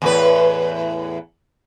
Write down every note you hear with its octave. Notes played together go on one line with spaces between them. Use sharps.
E2 A2 B4